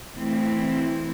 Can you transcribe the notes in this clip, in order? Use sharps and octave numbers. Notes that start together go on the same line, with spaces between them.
E3 A3 C4 E4